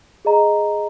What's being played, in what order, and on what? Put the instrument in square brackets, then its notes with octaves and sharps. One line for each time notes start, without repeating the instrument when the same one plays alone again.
[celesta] G#4 D#5 A#5